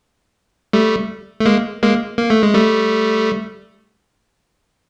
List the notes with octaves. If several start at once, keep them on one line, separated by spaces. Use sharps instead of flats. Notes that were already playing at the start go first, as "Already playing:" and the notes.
G3 A3
A3
G#3 A#3
G#3 A#3
A#3
A3
G#3
G3 A3